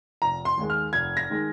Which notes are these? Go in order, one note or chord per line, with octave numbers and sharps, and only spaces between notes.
F1 A#5
C6
D#2 D#3 G#3
F6
F1 G#6
A#6
D#3 G#3